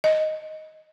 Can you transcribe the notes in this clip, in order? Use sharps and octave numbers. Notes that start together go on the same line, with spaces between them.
D#5